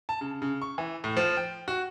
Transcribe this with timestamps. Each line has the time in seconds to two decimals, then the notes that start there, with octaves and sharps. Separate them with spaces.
0.09 A5
0.21 C#3
0.42 C#3
0.62 C#6
0.78 E3
1.04 A2
1.17 F3
1.37 G5
1.68 F#4